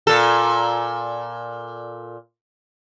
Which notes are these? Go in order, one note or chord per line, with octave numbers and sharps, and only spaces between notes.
A#2 A4